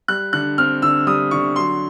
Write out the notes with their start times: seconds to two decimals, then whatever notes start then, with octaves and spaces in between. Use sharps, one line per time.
0.08 G3 F#6
0.33 D3 F#6
0.58 C4 F6
0.82 D3 E6
1.07 G3 D#6
1.31 D3 C#6
1.56 F#3 C6